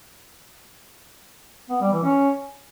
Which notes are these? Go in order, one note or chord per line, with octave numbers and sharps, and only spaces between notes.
B3
G3
E3
C#4